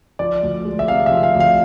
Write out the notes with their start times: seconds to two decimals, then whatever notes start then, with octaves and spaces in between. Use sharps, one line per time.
0.19 F3 D5
0.43 D2
0.65 G#3
0.79 E5
0.88 C3 F5
1.06 E5
1.11 F3
1.23 F5
1.34 D2
1.40 F5